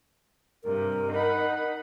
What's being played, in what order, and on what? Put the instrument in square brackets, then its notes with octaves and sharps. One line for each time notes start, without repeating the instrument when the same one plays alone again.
[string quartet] G2 C3 [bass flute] A#4
[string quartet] D#4 F#5 B5